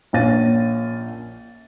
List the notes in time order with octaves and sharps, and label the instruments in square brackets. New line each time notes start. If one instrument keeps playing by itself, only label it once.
[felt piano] A#1 A#2 C#4 F5 A6 D#7